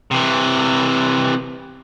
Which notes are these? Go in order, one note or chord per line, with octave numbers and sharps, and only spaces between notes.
C3 E3